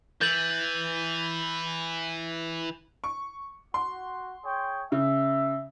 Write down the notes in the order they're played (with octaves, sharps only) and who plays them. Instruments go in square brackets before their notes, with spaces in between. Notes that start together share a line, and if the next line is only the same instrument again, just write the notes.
[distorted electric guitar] E3 [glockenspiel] G6 A6 F#7
[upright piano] C#6
[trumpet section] F#4 [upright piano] C6
[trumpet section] G#4 C#5 G5
[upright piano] C#3 [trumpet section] E5